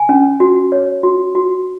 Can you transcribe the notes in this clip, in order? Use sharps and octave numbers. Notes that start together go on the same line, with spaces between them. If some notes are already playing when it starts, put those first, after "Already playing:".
Already playing: G#5
C#4
F#4
C#5
F#4
F#4